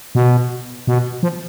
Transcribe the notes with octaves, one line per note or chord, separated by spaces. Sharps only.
B2
B2
F3